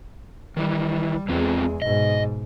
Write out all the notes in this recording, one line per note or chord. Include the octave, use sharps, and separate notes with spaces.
D#3 E3 G3
E2 E3 G#3 C4 F4
G#2 B2 D#5